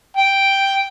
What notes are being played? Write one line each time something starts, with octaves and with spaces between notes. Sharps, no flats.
G5